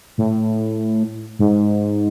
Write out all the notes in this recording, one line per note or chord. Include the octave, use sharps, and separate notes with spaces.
A2
G#2